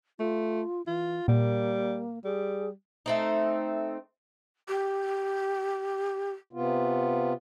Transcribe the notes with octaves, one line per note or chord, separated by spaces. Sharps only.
A3 F4
E3 F4
A#2 G3 A#3
G3 G#4
A3 C4 D#4
G4
C3 B3 F4